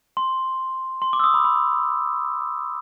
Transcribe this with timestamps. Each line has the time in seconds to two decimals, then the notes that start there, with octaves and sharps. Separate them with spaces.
0.17 C6
1.02 C6
1.13 D6
1.20 E6
1.24 D#6
1.34 B5
1.45 B5